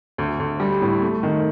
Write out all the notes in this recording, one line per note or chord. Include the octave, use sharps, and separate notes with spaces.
D2
D2
G3
A2
A3
D#3